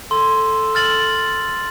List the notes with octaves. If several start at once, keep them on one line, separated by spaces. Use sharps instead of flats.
A4 C6
F6 A6 F#7